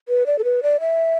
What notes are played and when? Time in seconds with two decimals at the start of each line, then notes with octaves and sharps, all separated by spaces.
0.09 B4
0.26 D5
0.39 A4
0.44 B4
0.63 D5
0.80 E5